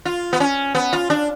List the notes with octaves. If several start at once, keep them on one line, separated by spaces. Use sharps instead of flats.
F4
B3
C#4
B3
F4
D4